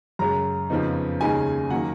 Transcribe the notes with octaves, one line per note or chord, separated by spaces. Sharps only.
F#2 C#3 G#3 C#4 A#5
F2 C#3 F3 B3 D#4
D#2 C#3 G#3 D#4 G#5
D#3 F#3 A#3 F#5